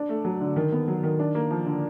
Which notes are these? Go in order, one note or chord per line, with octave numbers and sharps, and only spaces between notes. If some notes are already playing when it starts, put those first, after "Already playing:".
Already playing: D4
A3
F#3
D3
D#3
B3
F#3
D#3
D4
A#3
F3
D3